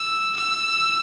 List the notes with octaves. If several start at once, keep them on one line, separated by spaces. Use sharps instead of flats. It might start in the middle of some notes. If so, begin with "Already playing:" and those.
Already playing: E6
E6